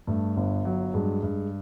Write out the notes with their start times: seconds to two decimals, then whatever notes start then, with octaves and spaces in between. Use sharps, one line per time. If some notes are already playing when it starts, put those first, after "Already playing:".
0.07 G2 A3
0.37 G1
0.65 F#3
0.94 G2 G#3
1.23 G2